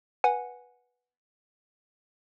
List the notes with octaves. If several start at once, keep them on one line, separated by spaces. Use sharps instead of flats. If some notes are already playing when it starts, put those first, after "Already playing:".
B4 F#5 G#5